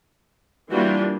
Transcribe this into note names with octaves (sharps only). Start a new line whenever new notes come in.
E3 G3 A#3 D4 F4 F#4